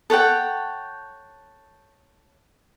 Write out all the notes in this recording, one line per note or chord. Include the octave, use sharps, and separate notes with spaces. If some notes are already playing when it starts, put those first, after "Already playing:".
A4 C#5 F#5 G5